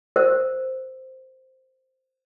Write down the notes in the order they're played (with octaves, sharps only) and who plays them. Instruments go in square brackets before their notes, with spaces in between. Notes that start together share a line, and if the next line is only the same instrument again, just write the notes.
[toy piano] A#4 C5